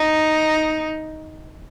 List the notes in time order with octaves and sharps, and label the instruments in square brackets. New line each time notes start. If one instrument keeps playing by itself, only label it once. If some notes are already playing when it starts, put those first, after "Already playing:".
Already playing: [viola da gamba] D#4